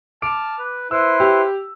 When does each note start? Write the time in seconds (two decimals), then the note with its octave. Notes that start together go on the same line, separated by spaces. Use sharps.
0.22 A5 D6 F6 D7
0.59 B4
0.91 E4 B4 C5 E6
1.20 G4